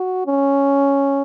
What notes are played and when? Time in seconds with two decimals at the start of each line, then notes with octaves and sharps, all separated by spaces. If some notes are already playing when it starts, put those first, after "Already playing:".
Already playing: F#4
0.26 C#4